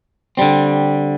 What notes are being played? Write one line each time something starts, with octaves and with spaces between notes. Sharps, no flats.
D3 G3 C4